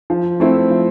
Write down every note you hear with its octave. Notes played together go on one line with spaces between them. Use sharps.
F3
A3 C4 E4
F3